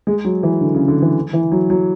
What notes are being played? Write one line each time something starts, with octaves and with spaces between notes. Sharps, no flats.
G#3
F#3
E3
D3
C#3
D3
E3
E3
F#3
F#3